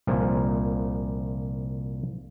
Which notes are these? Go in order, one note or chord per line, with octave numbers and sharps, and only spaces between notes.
C2 A#2 F3